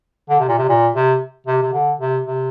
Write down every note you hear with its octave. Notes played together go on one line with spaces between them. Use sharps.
D3
C3
A#2
C3
A#2
C3
C3
C3
D3
C3
C3